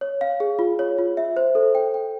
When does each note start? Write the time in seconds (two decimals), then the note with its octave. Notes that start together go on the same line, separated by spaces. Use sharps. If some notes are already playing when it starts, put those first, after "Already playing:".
0.01 C#5
0.21 F5
0.40 G#4
0.59 F4
0.79 C#5
0.98 F4
1.17 E5
1.37 C5
1.55 A4
1.75 G5
1.94 G5